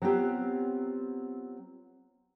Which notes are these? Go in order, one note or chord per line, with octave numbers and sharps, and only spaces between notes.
F#3 B3 C4 F4 G4